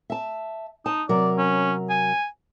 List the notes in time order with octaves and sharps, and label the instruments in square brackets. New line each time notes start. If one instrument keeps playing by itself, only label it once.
[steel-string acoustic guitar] E5 A5
[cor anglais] D#4 [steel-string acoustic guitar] A5
[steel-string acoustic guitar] C3 F#3 A#4 [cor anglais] D5
[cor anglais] C#4
G#5